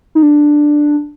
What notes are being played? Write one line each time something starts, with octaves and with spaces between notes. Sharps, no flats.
D#4
D4